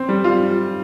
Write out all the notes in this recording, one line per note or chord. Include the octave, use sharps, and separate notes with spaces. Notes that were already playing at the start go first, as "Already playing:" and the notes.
Already playing: C4
G3
F4